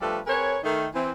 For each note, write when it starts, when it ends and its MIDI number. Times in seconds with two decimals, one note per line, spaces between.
0.01 0.19 53
0.01 0.19 55
0.01 0.19 57
0.01 0.19 62
0.01 0.19 69
0.01 0.19 71
0.27 0.58 60
0.27 0.58 68
0.27 0.58 70
0.27 0.58 71
0.27 0.58 73
0.64 0.87 51
0.64 0.87 57
0.64 0.87 63
0.94 1.12 52
0.94 1.12 60